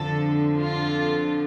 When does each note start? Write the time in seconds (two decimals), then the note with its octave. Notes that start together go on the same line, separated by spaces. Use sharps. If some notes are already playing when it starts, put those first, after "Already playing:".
Already playing: F2 D3 F3 A4
0.58 F4